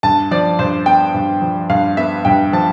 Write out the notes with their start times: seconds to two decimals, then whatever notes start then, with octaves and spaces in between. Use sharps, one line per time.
0.03 G2 A5
0.31 F3 D5
0.59 G2 C5
0.86 B3 G5
1.14 G2
1.42 F3
1.70 G2 F5
1.97 B3 E5
2.25 G2 G5
2.53 F3 A5